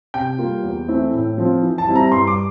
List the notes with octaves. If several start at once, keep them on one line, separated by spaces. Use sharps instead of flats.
C3 G5
G3 A#3 F4
E2
E3 A3 C4 E4
A2
F3 C4 F4
E3
A5
G3 C4 E4
A#5
G2 C6
D6